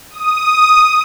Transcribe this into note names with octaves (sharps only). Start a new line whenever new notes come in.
D#6